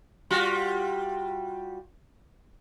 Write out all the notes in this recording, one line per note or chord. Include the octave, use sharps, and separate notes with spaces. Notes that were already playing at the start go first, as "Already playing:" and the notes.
G3 F4 F#4